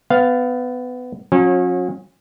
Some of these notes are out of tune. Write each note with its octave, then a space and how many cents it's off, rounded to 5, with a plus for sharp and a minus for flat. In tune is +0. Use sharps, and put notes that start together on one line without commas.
B3 +20 F5 +0
F#3 -45 C#4 -30